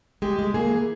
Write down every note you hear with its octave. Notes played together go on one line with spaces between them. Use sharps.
G#3 G4
G#3
A#3 G#4
E3